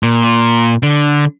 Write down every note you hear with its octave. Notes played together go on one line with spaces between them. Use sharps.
A#2
D3